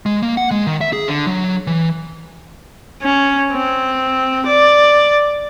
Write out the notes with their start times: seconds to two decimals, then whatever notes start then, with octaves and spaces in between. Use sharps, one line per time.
0.06 G#3
0.23 A#3
0.37 F#5
0.51 G#3
0.67 D#3
0.81 E5
0.93 G#4
1.08 D3
1.27 F#3
1.67 E3
3.03 C#4
3.53 C4
4.47 D5